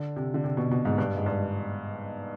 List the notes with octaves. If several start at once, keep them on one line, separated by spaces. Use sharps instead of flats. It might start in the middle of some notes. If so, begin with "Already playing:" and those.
Already playing: D3
C3
D3
C3
B2
B2
G#2
G2
G#2
G2